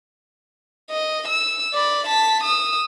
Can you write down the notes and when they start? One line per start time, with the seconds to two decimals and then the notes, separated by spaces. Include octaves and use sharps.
0.90 D#5
1.28 E6
1.73 D5 B5
2.07 A5 B6
2.43 D#6 E6